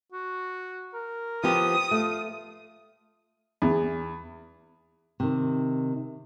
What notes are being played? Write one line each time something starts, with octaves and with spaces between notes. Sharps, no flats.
F#4
A#4
F3 B3 G4 D#6
A3 F4
E2
C3 D#3